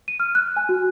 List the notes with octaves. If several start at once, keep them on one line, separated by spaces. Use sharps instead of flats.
D#7
F6
F#6
G#5
F#4